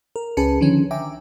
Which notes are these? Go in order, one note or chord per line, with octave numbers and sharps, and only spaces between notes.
A#4
C#2 C#4 G#4 B4 A5 C#7
D3 D#3 F3 C#4
E5 G5 G#5 A#5 D6